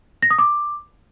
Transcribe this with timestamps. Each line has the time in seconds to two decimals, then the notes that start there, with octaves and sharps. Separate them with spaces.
0.23 A#6
0.31 D#6
0.39 D6